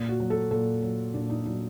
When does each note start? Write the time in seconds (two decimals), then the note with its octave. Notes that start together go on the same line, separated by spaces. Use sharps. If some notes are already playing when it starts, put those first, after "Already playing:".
Already playing: A#2
0.09 F#4
0.20 F#3
0.30 A4
0.51 A#2 A4
0.82 F#3
1.14 A#2 D4
1.30 D#4
1.46 F#3 D#4